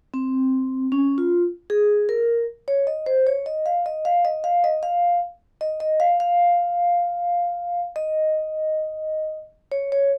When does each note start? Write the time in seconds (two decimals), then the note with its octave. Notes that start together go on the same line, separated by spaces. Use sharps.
0.14 C4
0.92 C#4
1.18 F4
1.70 G#4
2.09 A#4
2.68 C#5
2.87 D#5
3.06 C5
3.27 C#5
3.46 D#5
3.66 F5
3.86 D#5
4.05 F5
4.25 D#5
4.44 F5
4.64 D#5
4.83 F5
5.61 D#5
5.80 D#5
6.00 F5
6.20 F5
7.96 D#5
9.72 C#5
9.92 C#5